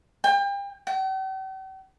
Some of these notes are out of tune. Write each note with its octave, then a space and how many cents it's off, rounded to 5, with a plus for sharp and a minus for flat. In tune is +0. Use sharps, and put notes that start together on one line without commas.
G5 +35
G5 -45